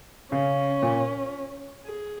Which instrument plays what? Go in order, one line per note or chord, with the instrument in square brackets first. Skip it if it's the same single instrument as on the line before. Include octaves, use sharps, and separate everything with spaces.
[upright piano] C#3 [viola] C#4
[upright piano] A#2
[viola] G#4